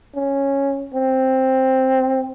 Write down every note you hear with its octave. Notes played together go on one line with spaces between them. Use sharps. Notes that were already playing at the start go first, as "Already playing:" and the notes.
C#4
C4